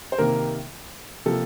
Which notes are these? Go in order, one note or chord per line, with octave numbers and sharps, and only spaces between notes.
C5
C3 D#3 A#3 A#4
C3 F3 A#3 A4